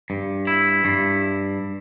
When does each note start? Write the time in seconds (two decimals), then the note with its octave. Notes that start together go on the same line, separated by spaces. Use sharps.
0.10 G2
0.47 E4
0.85 G2